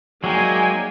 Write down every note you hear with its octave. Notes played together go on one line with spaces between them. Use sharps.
F#3 G#3 A#3 D#4 D5 G5 G#5